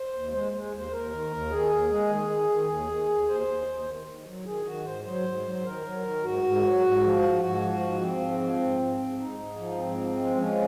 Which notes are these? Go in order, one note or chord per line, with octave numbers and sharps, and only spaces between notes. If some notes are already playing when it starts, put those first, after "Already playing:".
Already playing: C5
D#2
G#3 C5
G#3
D#2
C5
D#2 A#4
D#3
D#2
D#3 G#4
D#2
G#3
D#3
D#3
D#3
D#2
D#3
D#2
D#2 C5
D#2
D#2
D#3
D#3
F#3
D#3 G#4
D#3 F#4
G#2 C5
F#3 C5
G#2
F#3
D#3 A#4
F#3
D#3
G#2 F#4
G#2
F#3
G#2
F3
G#2
G#2 F#4
F3
G#2
F3 C4
G#2
F3
G#2
G#2
G#2
G#2 D#4
G#2
F3
G#2 C4
F3
G#3
F3 C#4